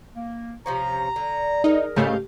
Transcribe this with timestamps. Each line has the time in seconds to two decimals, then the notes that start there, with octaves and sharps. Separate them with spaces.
0.16 A#3
0.66 C3 F3 C#4 A#5
1.16 D3
1.64 D#4 G#4 A#4
1.96 G#2 C#3 A3 G4 D#5 F5